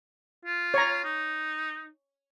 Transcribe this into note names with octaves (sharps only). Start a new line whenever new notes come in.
F4
C#5 A#5
D#4